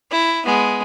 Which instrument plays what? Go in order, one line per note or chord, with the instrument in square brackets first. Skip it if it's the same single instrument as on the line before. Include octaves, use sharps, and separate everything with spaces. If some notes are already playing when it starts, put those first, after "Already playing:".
[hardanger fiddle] E4
G#3 B3